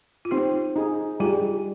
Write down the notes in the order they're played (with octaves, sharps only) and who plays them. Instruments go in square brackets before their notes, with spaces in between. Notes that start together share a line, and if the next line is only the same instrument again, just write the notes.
[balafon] F4
[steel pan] C4 [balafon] D#4 G4
[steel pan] D#4 G#4
[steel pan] G3 [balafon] F4 G#4